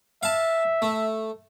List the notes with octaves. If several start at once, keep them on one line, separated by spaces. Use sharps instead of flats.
E5 F5 A5
A3